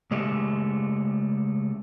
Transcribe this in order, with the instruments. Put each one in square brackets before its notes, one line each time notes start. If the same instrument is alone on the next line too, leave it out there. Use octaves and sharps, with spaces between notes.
[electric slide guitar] C#3 G#3 A3 G4